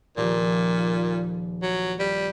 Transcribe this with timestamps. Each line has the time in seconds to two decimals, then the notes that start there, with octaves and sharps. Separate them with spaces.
0.17 D#1 A#2 F3
1.62 F#3
2.00 G3